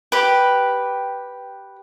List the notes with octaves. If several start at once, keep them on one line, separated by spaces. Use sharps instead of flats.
G4 B4